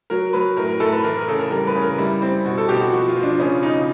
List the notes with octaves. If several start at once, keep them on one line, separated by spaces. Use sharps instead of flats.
F#3 A#4
F#3 B4
A2 A#4
A#4
A2 A4
B4
E3 A#4
A#4
C#3 A4
A#4
G3 A#4
B4
C#3
A#4
G3 E4
G3 C4
B2 F#4
A4
B2 G4
F#4
F3 F#4
F4
F3
D4
C#3 C#4
C#3 D#4